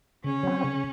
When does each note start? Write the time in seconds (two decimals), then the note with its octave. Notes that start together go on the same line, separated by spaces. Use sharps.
0.24 C#3 C#4
0.43 F#3 C4
0.64 C#3